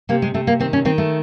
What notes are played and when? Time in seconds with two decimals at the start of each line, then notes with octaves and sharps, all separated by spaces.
0.09 C3 A#3
0.22 G#3
0.34 C3 A3
0.47 A#3
0.60 D#3 C4
0.73 C#4
0.85 D#3 C4
0.98 A3